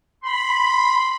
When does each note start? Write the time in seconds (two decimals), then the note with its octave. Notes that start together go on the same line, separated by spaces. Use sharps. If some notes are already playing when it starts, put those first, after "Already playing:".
0.23 B5 C6